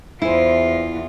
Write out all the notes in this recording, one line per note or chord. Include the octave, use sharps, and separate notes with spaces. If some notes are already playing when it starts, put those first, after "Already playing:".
E2 E4 F4 G#4 C5